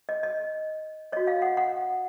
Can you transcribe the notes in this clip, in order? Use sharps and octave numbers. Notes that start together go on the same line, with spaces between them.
D#5
D#5
F#4 C#5 D#5
F5
F#5
F#5